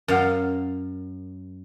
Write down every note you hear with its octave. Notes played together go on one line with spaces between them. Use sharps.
F#2 A#4 F5 F#5